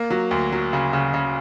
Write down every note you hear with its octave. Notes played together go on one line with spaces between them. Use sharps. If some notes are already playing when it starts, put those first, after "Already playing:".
Already playing: A#3
F#3
D2
F#3
C#3
C#3
C#3